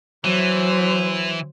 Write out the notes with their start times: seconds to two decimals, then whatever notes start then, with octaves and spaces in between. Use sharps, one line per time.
0.24 E3 F#3 C5